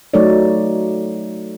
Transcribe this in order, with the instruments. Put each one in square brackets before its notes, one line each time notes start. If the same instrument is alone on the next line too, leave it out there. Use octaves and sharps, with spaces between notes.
[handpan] F#3 A3 D#4 A4 C#5 D5